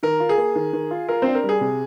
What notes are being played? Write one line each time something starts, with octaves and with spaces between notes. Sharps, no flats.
D#3 A#4
F4
G#4
A#3
D#3
D#3
F4
F4 A#4
C4 D4 C5
A#4
G3
G#4
C3